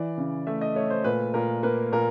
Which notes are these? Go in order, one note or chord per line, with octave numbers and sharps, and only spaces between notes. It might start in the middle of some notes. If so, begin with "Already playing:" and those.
Already playing: E3 D5
C#3
A3 E5
D#5
A3 C#5
C5
A#2 B4
A#2 A#4
A#3 B4
A#2 A#4